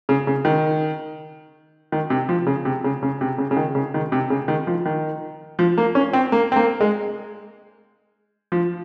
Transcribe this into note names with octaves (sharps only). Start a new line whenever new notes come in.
C#3
C#3
D#3
D#3
C3
F3
C#3
C3
C#3
C#3
C3
C#3
C#3
D#3
C#3
D#3
C3
C#3
D#3
F3
D#3
F3
A#3
C#4
C4
A#3
C4
A#3
G#3
F3